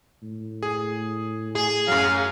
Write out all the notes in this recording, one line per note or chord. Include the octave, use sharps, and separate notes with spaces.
A2
G#4
G#4
F#2 F#3 F5